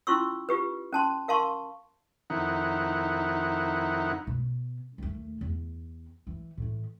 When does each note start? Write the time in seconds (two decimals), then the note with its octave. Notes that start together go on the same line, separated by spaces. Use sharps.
0.07 C#4 E4 F4 C6 C#6 E6
0.49 F4 G4 B4
0.93 C#4 A5 C6
1.28 A#4 F5 A5 C6 C#6
2.30 F2 D#3 D#4 E4 F#5
4.27 B2
4.98 D#2 A3
5.41 E2
6.27 E3
6.57 A2 E3